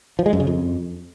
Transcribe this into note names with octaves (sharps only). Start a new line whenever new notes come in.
F3
G#3
F#2
C#3
F2